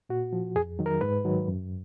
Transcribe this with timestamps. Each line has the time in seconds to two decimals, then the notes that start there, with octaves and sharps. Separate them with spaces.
0.09 A#2 F#4
0.33 F3
0.55 F2 G#4
0.79 D#3 F#3
0.86 A#4
1.01 G#2 B4
1.25 D#3 F#3
1.48 F#2